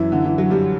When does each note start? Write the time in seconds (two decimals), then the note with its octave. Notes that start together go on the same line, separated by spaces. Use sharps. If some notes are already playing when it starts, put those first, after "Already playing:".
Already playing: F#2 E3 E4
0.12 D3
0.25 E3
0.38 F#3
0.50 G2 G3